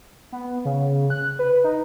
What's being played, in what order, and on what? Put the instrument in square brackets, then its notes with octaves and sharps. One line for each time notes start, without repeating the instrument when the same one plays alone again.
[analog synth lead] B3
C#3
F#6
B4
D#4